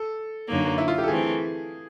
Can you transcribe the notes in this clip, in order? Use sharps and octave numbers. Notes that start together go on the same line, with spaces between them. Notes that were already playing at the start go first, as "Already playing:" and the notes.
Already playing: A4
F#2 D3 F#3 A#3 D#4
E4
F4
G4
A4
E3 A3 C4 G#4